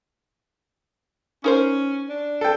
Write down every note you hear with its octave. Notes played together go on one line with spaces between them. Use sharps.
C#4 D#4 A#4 C5
D4
A4 G5